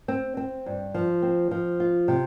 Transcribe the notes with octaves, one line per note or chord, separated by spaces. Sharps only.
C4
C4
G2
F3
C4
F3
F4
C3